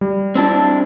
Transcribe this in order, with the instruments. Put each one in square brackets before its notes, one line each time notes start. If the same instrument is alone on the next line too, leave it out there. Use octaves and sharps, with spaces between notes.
[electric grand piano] G3
[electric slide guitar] C4 D4 E4